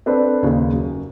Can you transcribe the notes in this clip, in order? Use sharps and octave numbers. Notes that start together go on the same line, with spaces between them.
C4 D4 A4 B4 C5
D#2 C#3
F#2